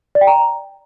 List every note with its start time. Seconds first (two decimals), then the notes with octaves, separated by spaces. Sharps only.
0.15 D5
0.21 G5
0.27 A#5